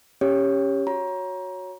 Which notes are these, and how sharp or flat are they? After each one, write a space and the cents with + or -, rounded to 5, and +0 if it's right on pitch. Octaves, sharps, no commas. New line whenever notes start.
C#4 +0 G4 +15 C#5 +0
F#4 -10 C#5 +0 A#5 +20